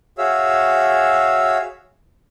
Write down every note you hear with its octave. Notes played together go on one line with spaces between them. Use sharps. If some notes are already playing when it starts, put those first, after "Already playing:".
F#4 G#4 C#5 E5 F5 E6